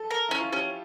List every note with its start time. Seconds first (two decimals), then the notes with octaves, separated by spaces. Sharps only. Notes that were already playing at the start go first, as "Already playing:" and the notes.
Already playing: A4
0.11 A#4
0.29 C#4 E4
0.40 F4
0.52 C#4 G4